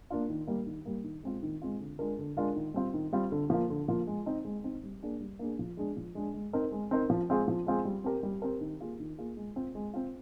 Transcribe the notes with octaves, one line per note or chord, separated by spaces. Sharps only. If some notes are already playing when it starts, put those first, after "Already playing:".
A#3 D4 F4
D#3
G3 A#3
D#3
G3 A#3
D#3
G#3 C4 F4
D#3
G#3 C4 F4
D3
G#3 D4 F4 A#4
D3
G#3 D4 F4 A#4
D#3
G3 C4 F4
D#3
G3 C4 F4
D3
F3 A#3 F4
D3
F3 A#3 F4
G#3
C4 D#4
G#3
C4 D#4
G3
A#3 D4 G#4
G3
A#3 D4 G#4
F3
G#3 D4 G#4
F3
G#3 D4 G#4
G#3
C4 D#4 A#4
G#3
C4 D#4 A#4
F3
G#3 C4 F4 G#4
F3
G#3 C4 F4 G#4
G3
C4 G4 A#4
G3
C4 G4 A#4
D#3
A#3 F4 G#4
D#3
A#3 F4 G#4
G#3
C4 F4
G#3
C4 F4